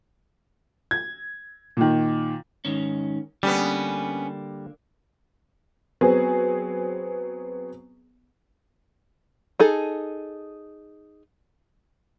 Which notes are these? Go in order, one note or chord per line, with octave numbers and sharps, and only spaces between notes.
G#6
A#2 D#3
G#2 D#3 C#4
D3 G3 A#3 B3 C#4
F#3 B3 C4 G#4
D#4 G#4 A4